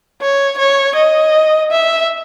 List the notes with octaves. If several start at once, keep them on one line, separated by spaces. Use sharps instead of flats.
C#5
C#5
D#5
E5